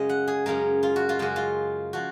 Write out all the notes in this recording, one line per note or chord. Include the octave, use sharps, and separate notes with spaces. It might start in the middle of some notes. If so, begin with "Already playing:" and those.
Already playing: F#2 C#3 G#3 G#4 D#5
F#5
G#4
F#2 C#3 G#3 A#4
F4
F#4
F4
F#2 C#3 G#3 F#4
F4
F3 F#4